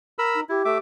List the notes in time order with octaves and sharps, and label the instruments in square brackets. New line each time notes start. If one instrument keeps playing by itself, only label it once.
[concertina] A#4 B5 E6
[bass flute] D#4
[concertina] E4 [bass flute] G4
[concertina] A3 E5 D6